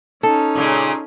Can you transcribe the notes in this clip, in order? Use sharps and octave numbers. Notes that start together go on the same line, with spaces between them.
C#4 D#4 A4
A#2 C#3 G#3